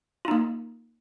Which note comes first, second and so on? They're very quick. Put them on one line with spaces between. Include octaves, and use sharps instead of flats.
F4 D#4 A#3